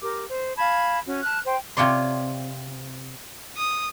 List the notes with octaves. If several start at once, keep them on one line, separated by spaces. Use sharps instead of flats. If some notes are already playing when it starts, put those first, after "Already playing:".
G4 A#4 D6
C5
F5 A5 B5 G#6
C#4 F#4
A5 F6 F#6
C5 G5
C3 F4 C#5 D5 C6
D#6